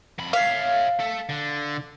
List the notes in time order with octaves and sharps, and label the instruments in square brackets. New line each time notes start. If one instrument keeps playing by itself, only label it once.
[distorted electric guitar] F2 B5
[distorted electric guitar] C#5 E5 [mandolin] F5
[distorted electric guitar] A4 E5
D3